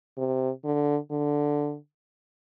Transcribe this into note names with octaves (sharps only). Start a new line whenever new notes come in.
C3
D3
D3